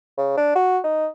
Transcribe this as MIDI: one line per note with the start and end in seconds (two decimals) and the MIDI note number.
0.18 0.32 49
0.37 0.55 62
0.55 0.78 66
0.84 1.07 63